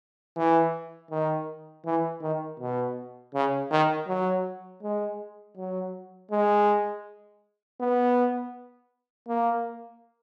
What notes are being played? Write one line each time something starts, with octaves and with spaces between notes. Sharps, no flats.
E3
D#3
E3
D#3
B2
C#3
D#3
F#3
G#3
F#3
G#3
B3
A#3